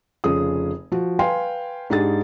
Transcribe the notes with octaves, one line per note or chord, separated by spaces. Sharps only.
F1 C#3 F4 G#4 D#6
F3 F#4
B4 F5 G5 G#5 C6
G#2 D4 G4 G#4 A6